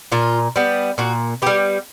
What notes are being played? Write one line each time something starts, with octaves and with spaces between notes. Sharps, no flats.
A#2 F4
G3 B3
A#2 F#4
G3 B3 G4